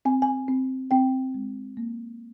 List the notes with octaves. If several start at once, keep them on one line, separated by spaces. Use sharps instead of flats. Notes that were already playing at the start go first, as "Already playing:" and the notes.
C4 G#5
G#5
C4
C4 G5
G#3
A#3